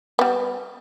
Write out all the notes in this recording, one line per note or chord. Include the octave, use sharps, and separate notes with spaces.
G3 B3